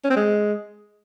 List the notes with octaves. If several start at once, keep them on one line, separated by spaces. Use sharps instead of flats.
C#4
C4
G#3